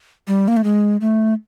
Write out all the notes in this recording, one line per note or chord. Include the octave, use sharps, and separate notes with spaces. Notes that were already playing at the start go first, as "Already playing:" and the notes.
G3
A#3
A3
G#3
A3